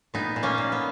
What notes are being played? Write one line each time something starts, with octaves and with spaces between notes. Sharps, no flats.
A#2 B3 D#4
A#2
A#3 C#4
A#2
B3